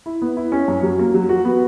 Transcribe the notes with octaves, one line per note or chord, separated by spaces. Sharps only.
E4
B3
E4
C#4
F#2
F#3
A#3
F#3
F#4
B3